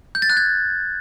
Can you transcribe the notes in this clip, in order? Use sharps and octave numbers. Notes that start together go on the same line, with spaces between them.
G6
A6
F#6
G#6